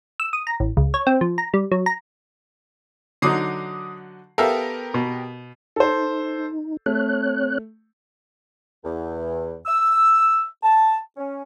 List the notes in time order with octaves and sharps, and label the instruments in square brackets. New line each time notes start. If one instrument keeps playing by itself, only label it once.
[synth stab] E6
D#6
A#5
A1
C#2
C#5
C4
F3
A#5
G3
F#3
A#5
[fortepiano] D3 F#3 D#4 [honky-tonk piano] D6 D#6 C7
[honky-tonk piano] B3 G4 A#4 [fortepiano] A4 E5 F5
[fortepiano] B2
[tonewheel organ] D#4 [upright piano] A4 C5
[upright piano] A3 [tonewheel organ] C4 C#5 F#6
[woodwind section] E2
E6
A5
C#4